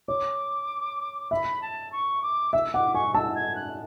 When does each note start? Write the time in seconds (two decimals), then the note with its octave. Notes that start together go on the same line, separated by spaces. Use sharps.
0.08 C#5 D6
1.31 E5 B5
1.62 A5
1.92 C#6
2.23 D6
2.53 E5 E6
2.74 F#5 D6
2.94 G#5 C#6
3.14 A5 E6
3.35 G#6
3.55 F#6